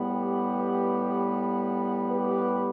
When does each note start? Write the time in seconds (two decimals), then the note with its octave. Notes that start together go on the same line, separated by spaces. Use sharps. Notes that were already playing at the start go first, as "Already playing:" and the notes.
Already playing: A2 G3 B3
0.08 G4 B4
2.10 G4 B4